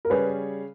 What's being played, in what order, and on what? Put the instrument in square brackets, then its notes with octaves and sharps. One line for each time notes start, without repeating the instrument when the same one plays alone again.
[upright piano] A#4
[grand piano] C#3 G3 C#4 G#4 [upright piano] B4